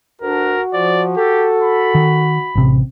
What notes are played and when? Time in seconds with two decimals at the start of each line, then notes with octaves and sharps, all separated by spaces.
0.21 D2 D4 F#4 A#4
0.73 F3 D5
1.16 G4 A4
1.62 B5
1.95 D#3
2.55 A1 C3